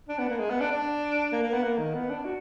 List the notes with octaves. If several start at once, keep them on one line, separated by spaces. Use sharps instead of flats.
D4
B3
A#3
G#3
B3
D4
D4
A#3
A#3
B3
A#3
D#3
B3
D4
F#4